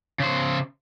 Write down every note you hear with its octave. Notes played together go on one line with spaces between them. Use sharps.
C#3 C5